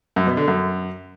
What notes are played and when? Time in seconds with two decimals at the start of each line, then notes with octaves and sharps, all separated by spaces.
0.16 F#2
0.27 B2
0.37 D3
0.48 F#2